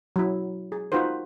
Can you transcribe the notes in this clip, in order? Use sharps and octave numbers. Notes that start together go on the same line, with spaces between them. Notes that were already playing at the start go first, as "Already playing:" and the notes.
F#3 E4
G#4
D#4 F4 F#4 B4 C5